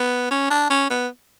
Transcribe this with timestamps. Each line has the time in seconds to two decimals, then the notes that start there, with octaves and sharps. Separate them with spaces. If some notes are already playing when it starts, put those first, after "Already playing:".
Already playing: B3
0.31 C#4
0.50 D4
0.70 C#4
0.90 B3